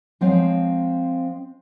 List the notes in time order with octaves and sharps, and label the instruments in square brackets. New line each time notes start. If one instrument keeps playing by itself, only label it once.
[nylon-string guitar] F3 G#3 C4 C#5 F5